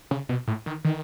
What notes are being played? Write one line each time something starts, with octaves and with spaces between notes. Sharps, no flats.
C#3
B2
A2
D#3
D#3